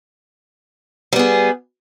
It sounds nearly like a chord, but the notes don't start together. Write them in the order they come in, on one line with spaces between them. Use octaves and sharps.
G3 B3 G#4